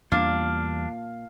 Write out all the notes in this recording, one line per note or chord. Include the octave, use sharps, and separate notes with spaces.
E2 A#2 G3 D4 F5